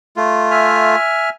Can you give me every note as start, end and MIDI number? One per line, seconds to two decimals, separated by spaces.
0.17 0.95 57
0.17 0.95 65
0.51 1.29 76
0.51 1.29 80
0.51 1.29 89